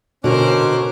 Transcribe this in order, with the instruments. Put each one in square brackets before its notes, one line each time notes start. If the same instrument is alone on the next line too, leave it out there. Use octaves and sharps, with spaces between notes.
[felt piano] B2 [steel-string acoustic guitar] D3 [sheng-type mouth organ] C#4 D6 F#6 [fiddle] A#4 C5